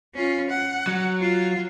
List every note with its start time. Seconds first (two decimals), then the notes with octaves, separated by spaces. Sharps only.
0.14 C#4 F4
0.50 F#5
0.87 F#3
1.21 F4